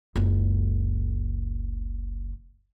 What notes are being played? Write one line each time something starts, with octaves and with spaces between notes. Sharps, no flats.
F#1 C#2